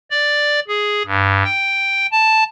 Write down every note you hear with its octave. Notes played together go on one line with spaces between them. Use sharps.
D5
G#4
G2
G5
A5